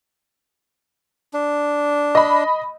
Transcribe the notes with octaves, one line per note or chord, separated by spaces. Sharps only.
D4
D#5 B5